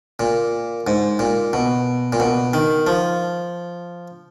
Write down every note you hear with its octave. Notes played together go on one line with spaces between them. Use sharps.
A#2
G#2
A#2
B2
A#2
B2
D#3
F3